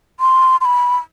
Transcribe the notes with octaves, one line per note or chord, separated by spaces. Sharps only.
C6
C6
B5